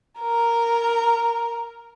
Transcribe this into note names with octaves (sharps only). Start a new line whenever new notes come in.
A#4 A#5